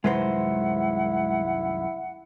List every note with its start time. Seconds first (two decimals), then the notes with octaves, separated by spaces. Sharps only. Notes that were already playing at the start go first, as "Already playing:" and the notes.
0.04 C2 F#2 D#3 G#3 E4 B4 C5 F#5